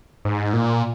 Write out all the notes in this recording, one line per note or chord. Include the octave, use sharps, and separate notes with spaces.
G#2
A#2